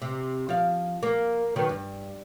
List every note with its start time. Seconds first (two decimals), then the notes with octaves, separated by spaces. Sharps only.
0.02 C3
0.49 F3 F5
1.03 A#3
1.56 D#3 F#3 B3
1.69 G2